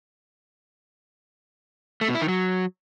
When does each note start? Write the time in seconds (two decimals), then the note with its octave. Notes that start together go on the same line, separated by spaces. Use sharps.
2.01 A3
2.08 B2
2.15 E4
2.22 D#3
2.28 F#3